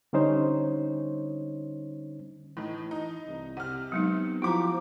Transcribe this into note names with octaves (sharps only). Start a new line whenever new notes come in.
D3 G3 C#4 D#4 C5 C#5
A2 E3 D#4
D#4
C2
C3 F#5 F6
F#3 G#3 B3 D#4
F3 E4 F#4 G4 A#5 D6